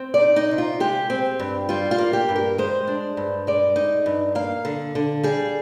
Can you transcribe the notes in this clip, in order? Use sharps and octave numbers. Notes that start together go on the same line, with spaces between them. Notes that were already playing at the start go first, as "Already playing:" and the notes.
Already playing: C4
D5
D#4
D#4
C3
F4
G#3 G4
C4
G2
G3 F4
F4
A#3
G4
G2
A#4
G#3 C5
D4
G2
G#3 D5
D#4
G2
A#3 F5
D3
D3
G3 G#4